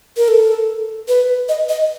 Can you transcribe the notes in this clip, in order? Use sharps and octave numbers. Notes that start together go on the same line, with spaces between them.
A#4
A4
B4
D#5
D#5